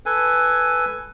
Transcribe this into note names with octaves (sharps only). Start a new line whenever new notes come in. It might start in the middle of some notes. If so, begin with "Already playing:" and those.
A4 B4 G#5